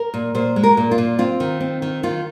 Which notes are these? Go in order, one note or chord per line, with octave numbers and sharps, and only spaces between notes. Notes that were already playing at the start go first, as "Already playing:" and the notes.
Already playing: A#4
A#2
A#2 C5
G#3
A#4
A#2
F4
A#2
C4 F4
D#3
C4
D#3
D#3 F4